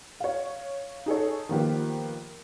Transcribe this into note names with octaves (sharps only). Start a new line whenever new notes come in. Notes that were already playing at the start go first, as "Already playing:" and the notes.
C#5 F5
D#4 G#4 A4 C#5
D#3 F3 A#3 B3 G4 B4